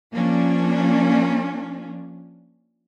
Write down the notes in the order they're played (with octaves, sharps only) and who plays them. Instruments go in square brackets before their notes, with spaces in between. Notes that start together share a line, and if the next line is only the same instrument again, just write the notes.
[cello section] F3 A#3 C#4 D4